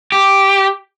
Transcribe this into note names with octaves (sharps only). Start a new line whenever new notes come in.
G4